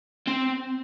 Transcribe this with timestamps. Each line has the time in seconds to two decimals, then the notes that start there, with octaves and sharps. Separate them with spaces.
0.28 C4